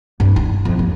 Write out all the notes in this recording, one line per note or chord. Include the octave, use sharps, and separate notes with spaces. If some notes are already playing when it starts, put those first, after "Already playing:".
G2
D#4
F2
D#2